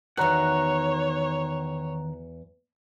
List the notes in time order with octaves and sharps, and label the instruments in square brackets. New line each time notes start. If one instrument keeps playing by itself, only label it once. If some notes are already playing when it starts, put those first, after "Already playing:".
[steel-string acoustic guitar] E2 F#4 [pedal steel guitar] D#3 F#5 [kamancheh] C#5 [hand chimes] A#5 F#6